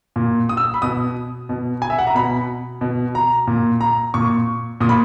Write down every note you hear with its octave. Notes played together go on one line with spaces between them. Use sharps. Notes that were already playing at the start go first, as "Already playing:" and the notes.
A#2
D#6
E6
B5
B2 D#6
B2
G#5
E5
F#5
A#5
B2 B5
B2
A#5
A#2
A#5
A#2 C#6
A#2 D#6
B5